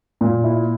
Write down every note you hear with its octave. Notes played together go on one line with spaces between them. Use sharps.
A#2
E4